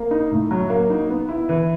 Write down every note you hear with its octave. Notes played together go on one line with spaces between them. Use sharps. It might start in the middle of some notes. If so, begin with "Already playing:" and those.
Already playing: A#3
D#4
A2
F#3
A#3
D#4
B3
E4
E3